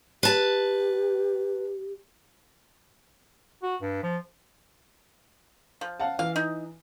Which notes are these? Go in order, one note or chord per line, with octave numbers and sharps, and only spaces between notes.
G4 B4 A5
F#4
G2
F3
F3
F5 F#5 A5
E3 F5
D#4